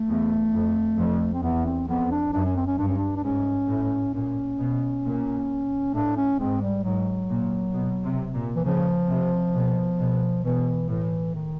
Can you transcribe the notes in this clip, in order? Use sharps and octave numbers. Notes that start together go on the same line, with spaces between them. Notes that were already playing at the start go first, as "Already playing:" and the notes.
Already playing: A3
E2
F2
F2
C4
E2 B3
C4
F2 B3
D4
F#2 D4
C#4
C4
C#4
G2 D4
C#4
D4
D4
G#2 C#4
A2
A#2 C#4
B2
A#2
A2 D4
C#4
G#2 C4
G3
G#2 F#3
A#2
B2
C3
A#2
E3
C#3 F3
C3
B2
B2
B2 E3
A2 E3
D#3